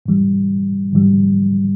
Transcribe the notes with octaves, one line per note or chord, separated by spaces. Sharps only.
G#2 E3 G3
G#2 E3 G3